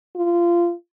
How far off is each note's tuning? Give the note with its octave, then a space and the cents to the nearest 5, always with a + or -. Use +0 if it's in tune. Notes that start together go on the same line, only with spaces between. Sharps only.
F4 -20